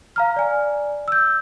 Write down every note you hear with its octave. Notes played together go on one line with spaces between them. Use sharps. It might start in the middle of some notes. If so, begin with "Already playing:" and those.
F5 A#5 F6
D5 G#5
E6 G6